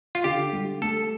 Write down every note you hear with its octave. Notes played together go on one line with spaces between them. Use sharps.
F4
D3 G4
G3
A3 A4